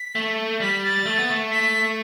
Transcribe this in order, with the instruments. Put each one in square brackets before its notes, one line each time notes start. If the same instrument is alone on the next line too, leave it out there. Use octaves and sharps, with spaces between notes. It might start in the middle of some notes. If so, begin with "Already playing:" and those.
Already playing: [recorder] B6
[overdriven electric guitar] A3
[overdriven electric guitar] G3 [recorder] B6
[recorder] A6
[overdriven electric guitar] A3
B3
A3
[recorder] B6